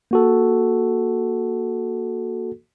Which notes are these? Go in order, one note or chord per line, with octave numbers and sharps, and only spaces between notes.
A#3 F#4 A4